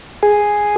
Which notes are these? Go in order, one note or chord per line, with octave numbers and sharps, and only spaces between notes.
G#4